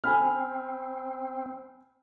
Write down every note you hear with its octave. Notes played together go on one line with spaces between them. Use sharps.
C4 G#5 B5 F6